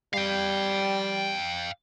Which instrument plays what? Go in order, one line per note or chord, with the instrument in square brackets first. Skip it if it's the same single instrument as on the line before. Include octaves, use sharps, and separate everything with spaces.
[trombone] G3 [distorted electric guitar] F5 G5